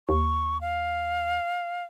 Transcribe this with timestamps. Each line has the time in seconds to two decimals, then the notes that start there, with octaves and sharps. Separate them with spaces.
0.09 D#2 C#6
0.61 F5